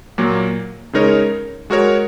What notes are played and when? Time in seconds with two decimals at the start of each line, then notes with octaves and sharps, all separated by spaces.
0.18 A#2 F#3 A#3
0.93 C#3 G#3 D#4 A#4 C#5
1.70 G#3 F#4 A#4 C#5